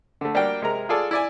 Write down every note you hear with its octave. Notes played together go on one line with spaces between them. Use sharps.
D3 A3
G3 A#3 D4 F#4 G5
C3 G#3 A#4 A#5
F4 G#4 A4 D5
E4 D5 G#5